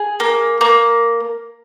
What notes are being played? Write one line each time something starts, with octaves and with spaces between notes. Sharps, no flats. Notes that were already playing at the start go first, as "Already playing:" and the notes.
Already playing: G#4
A#3
A#3